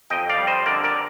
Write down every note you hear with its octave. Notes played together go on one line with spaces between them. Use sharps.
F2 D#5 G5
D5 F5
G3
C5 D#5
D3 A#4 D5
A#4 D5